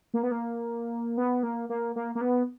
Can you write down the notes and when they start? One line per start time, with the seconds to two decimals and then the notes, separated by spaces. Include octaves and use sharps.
0.14 A#3
0.23 B3
0.31 A#3
1.18 B3
1.43 A#3
1.69 A#3
1.96 A#3
2.15 A#3
2.21 B3